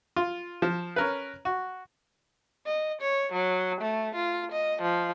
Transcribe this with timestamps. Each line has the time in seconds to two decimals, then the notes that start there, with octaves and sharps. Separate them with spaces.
0.16 F4
0.62 F3
0.96 C#4 A#4 B4
1.45 F#4
2.66 D#5
3.01 C#5
3.32 F#3
3.81 A3
4.15 F4
4.52 D#5
4.81 F3